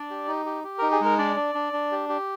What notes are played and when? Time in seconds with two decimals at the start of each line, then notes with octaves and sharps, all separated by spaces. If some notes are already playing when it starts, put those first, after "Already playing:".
Already playing: D4 D5
0.11 G4
0.28 D#4
0.46 G4
0.64 G4
0.78 D#4 A#4
0.92 G#4
1.01 G#3 A#4
1.18 D4 D5
1.36 D4
1.55 D4
1.73 D4
1.92 G4
2.09 G4